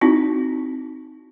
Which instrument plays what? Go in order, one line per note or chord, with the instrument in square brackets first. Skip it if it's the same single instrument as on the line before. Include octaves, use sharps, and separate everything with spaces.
[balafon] C4 D#4 E4 F#4